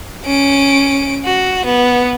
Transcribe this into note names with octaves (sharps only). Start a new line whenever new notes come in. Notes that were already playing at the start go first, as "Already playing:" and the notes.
C#4 D7
F#4
B3